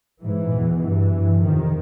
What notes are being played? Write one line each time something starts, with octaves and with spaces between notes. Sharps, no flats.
G#2 E3
E2 B2
G2 E3
G2
F2 C3 D#3